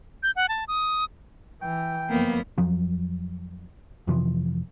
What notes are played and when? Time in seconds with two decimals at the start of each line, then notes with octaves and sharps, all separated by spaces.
0.23 G6
0.36 F#5
0.49 A5
0.68 D#6
1.62 E3 G5
2.10 F#1 F2 A#3 B3
2.58 F2 F3 F#3
4.07 F2 C3 E3 F3